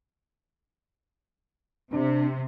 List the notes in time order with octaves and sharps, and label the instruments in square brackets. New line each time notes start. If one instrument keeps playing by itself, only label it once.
[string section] C3 [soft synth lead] D4